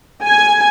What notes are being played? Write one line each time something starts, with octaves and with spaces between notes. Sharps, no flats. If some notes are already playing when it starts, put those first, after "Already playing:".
G#5